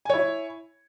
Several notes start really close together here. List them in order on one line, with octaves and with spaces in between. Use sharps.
G#5 C#5 E4